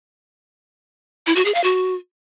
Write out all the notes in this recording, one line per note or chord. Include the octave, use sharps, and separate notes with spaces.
E4
F#4
G#4
F5
F#4